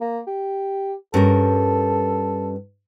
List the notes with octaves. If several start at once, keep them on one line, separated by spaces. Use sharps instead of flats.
A#3
G4
G2 C#4 A4 A#4